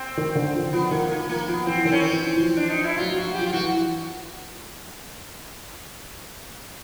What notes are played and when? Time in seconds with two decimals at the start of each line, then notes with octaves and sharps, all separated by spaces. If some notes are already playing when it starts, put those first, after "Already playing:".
Already playing: C4
0.17 D#3
0.35 D3
0.54 F3
0.73 F3 B3
0.91 D#3 A#3
1.10 F3 A#3
1.29 F3 A#3
1.48 F3 B3
1.67 E3 C4
1.85 D#3 C4
1.92 C#4
1.99 C4
2.13 E3
2.36 E3
2.41 F3
2.57 D4
2.70 D#4
2.84 E4
2.97 F#3 F4
3.11 F#3
3.16 F#4
3.26 F#3
3.34 F3 G4
3.46 F4
3.53 E3 F#4